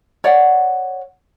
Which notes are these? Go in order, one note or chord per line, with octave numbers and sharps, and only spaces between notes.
C#5 D5 F#5